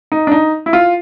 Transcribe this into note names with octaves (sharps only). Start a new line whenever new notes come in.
D#4
D4
D#4
E4
F4